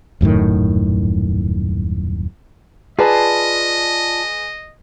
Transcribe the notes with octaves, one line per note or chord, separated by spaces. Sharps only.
D#1 F#2 A2 D#3
F4 G#4 B4 D5 D#5 A5